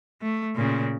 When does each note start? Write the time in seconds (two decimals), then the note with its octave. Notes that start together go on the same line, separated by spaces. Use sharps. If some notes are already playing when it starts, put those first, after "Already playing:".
0.22 A3
0.55 A#2 C#3